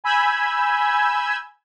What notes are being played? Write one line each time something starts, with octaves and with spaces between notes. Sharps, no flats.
G#5 B5 E6 G6 G#6